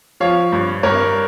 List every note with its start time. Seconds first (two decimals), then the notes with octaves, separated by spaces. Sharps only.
0.20 F3 C#5 F5
0.52 G2
0.83 G2 A#4 C#5